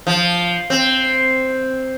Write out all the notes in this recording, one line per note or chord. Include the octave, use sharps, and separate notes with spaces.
F3
C4